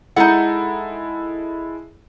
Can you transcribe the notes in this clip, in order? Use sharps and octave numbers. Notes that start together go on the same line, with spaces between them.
G#3 D#4 E4 A4 F#5